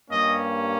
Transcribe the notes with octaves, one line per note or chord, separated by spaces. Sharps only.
G2 G3 A#3 C#4 D#5